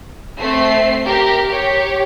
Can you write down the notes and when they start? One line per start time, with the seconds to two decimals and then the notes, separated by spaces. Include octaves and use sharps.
0.39 A3 C4 C7
1.06 G4 A#4
1.49 G4 C#5